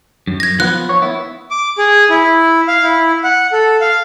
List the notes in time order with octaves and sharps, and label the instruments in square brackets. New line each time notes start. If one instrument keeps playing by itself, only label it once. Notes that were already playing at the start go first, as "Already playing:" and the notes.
[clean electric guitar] F#2
[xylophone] G#6 A#6
[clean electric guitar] F3 B3 [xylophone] F#6
[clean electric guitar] C#5
B3 E4
[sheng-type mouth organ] D6
G#4
E4
F5
E4
F#5
A4
F5